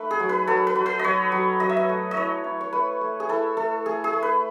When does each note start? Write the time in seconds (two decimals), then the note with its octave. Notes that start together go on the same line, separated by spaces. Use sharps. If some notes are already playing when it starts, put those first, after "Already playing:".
Already playing: A3 D#4 B4
0.11 G#4
0.20 F#3
0.29 B4
0.47 F#3 A4
0.67 B4
0.76 F#3
0.86 B4
0.99 F#3 C#5 D#5
1.32 F#3
1.60 F#3 D#5
1.69 E5
1.77 D#5
1.89 A3
2.11 D#5
2.16 E4 C#5
2.44 E4
2.61 C#5
2.73 A3 B4
3.01 A3
3.20 G#4
3.29 E4 A4
3.57 A3 A4
3.86 A3 G#4
4.04 G#4
4.13 A3
4.23 B4